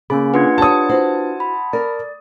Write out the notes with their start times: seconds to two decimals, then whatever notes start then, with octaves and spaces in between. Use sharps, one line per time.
0.10 C#3 A#3 C#4 G#4 B5
0.34 D4 F4 B4 F#5 C6 G#6
0.58 G4 C#5 A5 D#6
0.89 E4 F#4 C5
1.40 B5
1.73 A#4 D5